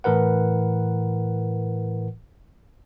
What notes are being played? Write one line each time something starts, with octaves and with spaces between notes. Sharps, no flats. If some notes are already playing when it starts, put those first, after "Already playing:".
A2 E3 A#4 B4 F#5